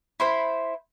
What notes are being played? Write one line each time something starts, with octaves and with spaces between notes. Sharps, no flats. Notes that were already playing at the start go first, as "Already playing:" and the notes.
E4 C5 B5